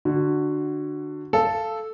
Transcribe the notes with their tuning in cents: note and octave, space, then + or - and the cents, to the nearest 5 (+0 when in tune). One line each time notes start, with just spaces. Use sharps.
D3 +20 F#4 +0
A4 -5 F5 -20